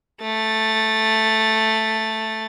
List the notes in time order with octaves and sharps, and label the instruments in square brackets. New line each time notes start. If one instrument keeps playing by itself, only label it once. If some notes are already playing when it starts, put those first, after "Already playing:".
[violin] A3 A6